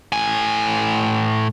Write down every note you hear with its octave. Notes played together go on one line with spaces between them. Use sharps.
A2 G#5